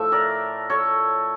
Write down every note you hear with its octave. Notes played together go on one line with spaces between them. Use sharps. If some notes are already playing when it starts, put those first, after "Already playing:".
Already playing: A2 F3 A3 E5
A#4 D5
A4 C#5